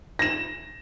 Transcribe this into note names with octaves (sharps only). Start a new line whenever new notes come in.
A#6 E7